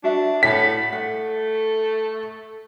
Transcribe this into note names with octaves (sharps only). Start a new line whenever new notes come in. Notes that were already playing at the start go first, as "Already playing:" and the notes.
D4 F#4 E5
A2 C#5 F#5 A5 B6
A3 F#5